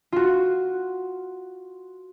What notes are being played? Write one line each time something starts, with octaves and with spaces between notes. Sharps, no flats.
F4 F#4